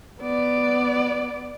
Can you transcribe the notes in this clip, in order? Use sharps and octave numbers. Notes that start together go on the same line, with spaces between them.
B3 D5